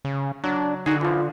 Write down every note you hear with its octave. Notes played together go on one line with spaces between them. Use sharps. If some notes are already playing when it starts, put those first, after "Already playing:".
C#3
F#3 D4
D3 D#4 F#4 G#4
E3 F3 F4